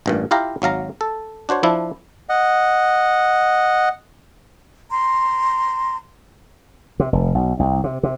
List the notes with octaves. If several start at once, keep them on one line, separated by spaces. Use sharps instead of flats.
A1 G2 A#2
E4 F4 G4 F5 A#5
G#1 F#3 F5 A#5
A4
D4 F#4 C5 C#5
F3 D4 E4
D#5 F#5
A#5 C6
C3
F1
B1
C2
C3
C3